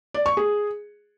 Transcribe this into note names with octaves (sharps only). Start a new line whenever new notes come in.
D5
C#6
G#4